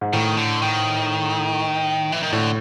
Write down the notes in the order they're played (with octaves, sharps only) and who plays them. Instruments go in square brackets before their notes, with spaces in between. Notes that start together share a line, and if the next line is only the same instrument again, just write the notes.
[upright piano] G#2
[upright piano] A2 [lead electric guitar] D#3
[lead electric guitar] D3
D#3
E3
D#3
[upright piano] A2 [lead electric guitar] D3